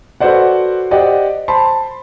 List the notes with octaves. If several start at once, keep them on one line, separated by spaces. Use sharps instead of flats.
F#4 A4 B4 C5 D5 F#5
G4 C5 D5 D#5 F#5
C5 A5 B5 C6